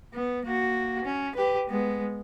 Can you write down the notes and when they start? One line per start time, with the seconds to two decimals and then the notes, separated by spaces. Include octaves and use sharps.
0.14 B3
0.45 A#3 F#4
1.04 C#4
1.35 G4 B4
1.69 G#3 B3